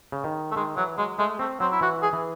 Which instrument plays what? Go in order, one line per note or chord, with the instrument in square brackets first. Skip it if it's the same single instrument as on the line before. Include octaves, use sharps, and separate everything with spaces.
[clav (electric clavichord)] C#3
D#3
[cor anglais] A3
[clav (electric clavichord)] D#3 [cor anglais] G#3
[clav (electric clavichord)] E3 [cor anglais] F#3
[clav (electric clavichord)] F#3 [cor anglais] G#3
[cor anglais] G#3 [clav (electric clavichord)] A3
[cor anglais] A3 [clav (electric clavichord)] C4
[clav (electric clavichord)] F#3 [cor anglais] C4
[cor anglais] E4
[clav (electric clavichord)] E3 [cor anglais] F#4
[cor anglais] G#4
[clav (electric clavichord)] E3